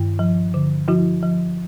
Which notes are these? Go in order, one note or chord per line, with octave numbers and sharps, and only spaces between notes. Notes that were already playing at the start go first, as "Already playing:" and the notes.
Already playing: G2 D#3
F3
D3
F3 E4 F#4
F3